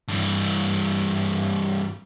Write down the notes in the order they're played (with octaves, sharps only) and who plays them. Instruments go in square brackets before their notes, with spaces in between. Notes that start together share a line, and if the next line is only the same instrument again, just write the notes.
[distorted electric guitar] G2 E3